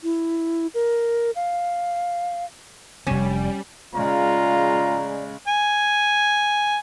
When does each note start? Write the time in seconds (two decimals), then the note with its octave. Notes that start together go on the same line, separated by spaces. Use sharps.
0.04 E4
0.74 A#4
1.36 F5
3.07 F1 C3 G3 C#4
3.95 C#3 G#3 F4 D5 A#5
5.48 G#5